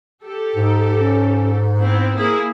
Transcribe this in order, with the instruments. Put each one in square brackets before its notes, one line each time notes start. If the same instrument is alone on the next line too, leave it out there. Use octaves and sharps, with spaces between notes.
[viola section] G4 A4
[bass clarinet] G#2 [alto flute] D#4
[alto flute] C#4
[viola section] B3 C4 E4 [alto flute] C5
[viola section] A#3 E4 G#4